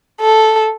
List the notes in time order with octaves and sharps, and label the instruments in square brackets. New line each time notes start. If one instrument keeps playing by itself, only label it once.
[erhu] A4